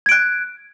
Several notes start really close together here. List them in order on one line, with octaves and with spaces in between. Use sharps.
G#6 D7 F#6